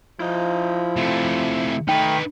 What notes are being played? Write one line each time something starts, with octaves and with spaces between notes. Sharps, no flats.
F3 E4 D#5
C3 A3
D#3 A3 D#4 B4 G5